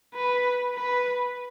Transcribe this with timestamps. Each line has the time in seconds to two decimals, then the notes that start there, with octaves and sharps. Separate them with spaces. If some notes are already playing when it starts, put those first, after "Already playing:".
0.14 B4
0.75 B4